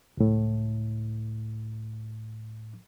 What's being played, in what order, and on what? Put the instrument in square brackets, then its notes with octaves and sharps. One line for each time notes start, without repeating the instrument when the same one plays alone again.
[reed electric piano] C#2 A2